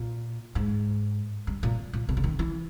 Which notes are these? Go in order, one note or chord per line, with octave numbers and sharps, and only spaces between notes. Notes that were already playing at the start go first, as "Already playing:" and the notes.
Already playing: A#2
G#2
G2
A#2
A#2
B2
C#3
D#3
E3